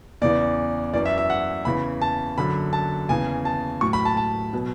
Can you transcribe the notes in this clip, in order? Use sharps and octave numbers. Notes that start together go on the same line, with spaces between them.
E2 C#3 E3 D5
F#2 E3 D5
E5
E5
F#5
E2 C#3 E3 B5
A5
F#2 D3 F#3 B5
A5
E2 C#3 E3 G#5
A5
A2 F#3 C#6
B5
A5
A5
B2 F#3